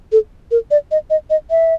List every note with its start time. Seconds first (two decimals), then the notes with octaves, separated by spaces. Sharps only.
0.12 A4
0.51 A#4
0.71 D5
0.91 D#5
1.10 D#5
1.30 D#5
1.51 E5